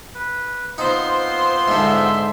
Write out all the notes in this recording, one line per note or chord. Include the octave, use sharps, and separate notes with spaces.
B4
B3 C4 D#4 F4 C5 C6
G#2 D3 E5